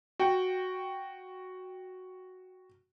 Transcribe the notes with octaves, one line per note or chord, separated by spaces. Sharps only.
F#4 G5